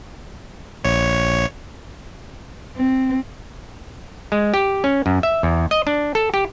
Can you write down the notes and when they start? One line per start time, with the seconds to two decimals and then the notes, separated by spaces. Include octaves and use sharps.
0.84 A#1 C#5
2.77 C4
4.32 G#3
4.54 G4
4.84 C#4
5.06 F#2
5.23 E5
5.43 E2
5.71 D#5
5.87 D4
6.15 A4
6.34 G4